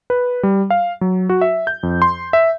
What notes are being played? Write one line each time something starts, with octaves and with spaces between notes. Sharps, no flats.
B4
G3
F5
F#3
F#4
E5
G6
F2
C6
E5